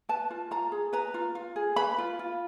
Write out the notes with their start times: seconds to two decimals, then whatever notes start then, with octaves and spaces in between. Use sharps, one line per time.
0.09 B4 A5
0.31 F4
0.51 F4 A#5
0.72 G#4
0.93 B4 A#5
1.14 F4
1.35 F4
1.56 G#4
1.76 B4 B5
1.98 F4
2.19 F4